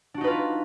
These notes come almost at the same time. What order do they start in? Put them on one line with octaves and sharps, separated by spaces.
D4 F#4 D#4 B4 F4